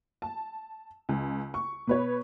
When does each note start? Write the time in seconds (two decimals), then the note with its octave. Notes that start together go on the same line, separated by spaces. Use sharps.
0.22 A5
1.09 C#2
1.54 C#6
1.87 B2 B4 C#5